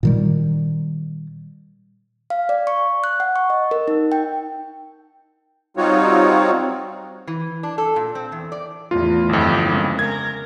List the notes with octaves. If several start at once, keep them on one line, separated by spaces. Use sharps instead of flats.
A#2 D#3 G3
F5
D5
C#6
F#6
F#5
C#6
D#5
A#4
D#4
G5
G3 C4 D#4 F4 F#4 C#5
E3
D4
A4
A#2
C4
E2
D5
E2 A2 F4
G1 F2 E4 G4
C#3 G#3 A#3
A#4 G#6